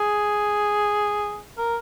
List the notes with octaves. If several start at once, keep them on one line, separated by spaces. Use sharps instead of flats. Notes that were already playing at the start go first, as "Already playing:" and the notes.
Already playing: G#4
A#4